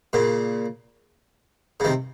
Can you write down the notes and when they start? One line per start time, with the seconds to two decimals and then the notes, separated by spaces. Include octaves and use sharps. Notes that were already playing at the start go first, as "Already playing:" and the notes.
0.13 A#2 C#3
1.80 C#3
1.84 C3 D#3